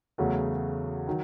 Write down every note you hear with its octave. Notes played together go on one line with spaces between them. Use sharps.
E2 C#3 F#3 A3
D#3 F#3